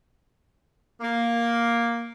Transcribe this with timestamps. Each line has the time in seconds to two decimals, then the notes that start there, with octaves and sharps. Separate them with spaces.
1.01 A#3